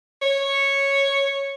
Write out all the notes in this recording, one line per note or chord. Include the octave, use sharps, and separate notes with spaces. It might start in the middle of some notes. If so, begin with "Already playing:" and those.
C#5